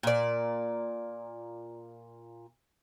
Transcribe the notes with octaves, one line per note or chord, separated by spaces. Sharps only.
A#2 D5